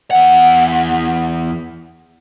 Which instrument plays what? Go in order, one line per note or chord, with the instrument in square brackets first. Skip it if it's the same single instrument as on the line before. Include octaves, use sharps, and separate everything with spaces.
[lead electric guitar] E2 F#5